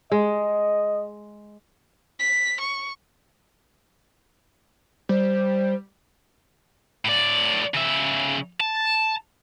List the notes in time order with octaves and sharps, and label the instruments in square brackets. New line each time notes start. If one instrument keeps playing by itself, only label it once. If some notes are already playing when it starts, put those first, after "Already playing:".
[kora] G#3 [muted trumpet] D#5
[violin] B6
C#6
[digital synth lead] G3 [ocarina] C5
[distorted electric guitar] A2 D5
C#3 E5
A5